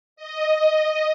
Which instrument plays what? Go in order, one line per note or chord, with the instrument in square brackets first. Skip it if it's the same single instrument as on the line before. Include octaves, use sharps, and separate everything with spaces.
[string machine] D#5